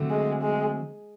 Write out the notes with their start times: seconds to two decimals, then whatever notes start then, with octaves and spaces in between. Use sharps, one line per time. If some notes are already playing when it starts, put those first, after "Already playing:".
Already playing: D3 F#3 A3 C4
0.11 G#3
0.42 G#3